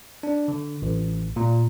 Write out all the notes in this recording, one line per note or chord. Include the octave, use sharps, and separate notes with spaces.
D4
D3
A1
A#2